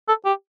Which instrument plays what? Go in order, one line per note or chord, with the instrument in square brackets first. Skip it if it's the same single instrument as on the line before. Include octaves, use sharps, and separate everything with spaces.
[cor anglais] A4
G4